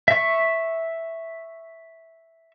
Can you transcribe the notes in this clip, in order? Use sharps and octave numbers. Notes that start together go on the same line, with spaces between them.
E5 C#6